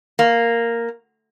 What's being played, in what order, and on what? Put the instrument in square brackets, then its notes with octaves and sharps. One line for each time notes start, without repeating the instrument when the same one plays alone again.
[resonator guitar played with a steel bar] A#3